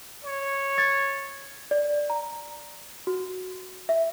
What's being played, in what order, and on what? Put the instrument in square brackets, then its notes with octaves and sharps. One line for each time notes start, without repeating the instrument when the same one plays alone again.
[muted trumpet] C#5
[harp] G#6 A6
[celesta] D5
A#5
F#4
E5